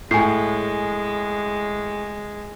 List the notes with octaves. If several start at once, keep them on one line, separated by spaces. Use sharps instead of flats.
A2 G#3 G#5 C7